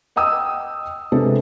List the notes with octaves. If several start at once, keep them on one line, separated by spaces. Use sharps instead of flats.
D#5 F#5 G5 D#6 E6
C3 G#3 B3 D4 A4